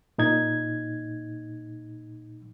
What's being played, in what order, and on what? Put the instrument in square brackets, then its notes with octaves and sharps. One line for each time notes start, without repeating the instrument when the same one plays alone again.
[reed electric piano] A#2 D#4 G#6